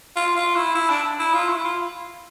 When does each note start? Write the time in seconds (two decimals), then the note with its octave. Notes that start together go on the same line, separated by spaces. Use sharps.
0.16 F4
0.36 F4
0.56 E4
0.75 E4
0.90 D4
1.19 E4
1.34 F4
1.49 E4
1.64 F4